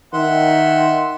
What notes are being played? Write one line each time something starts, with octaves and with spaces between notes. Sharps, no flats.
D#3 E5 F#5 C6